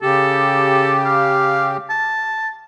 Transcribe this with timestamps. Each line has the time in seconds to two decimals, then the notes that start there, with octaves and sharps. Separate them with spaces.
0.02 C#3 G4 A4
1.06 F5
1.90 A5